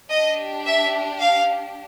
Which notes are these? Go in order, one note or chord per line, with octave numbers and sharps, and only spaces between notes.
D4 G4 D#5
E5
F5